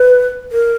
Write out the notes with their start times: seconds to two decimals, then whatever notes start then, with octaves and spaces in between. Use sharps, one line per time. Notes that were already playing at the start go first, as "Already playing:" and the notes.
Already playing: B4
0.52 A#4